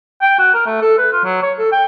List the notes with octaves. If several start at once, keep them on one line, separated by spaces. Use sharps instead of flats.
G5
F#4
A#4
A3
A4
B4
F4
F#3
C#5
A4
G5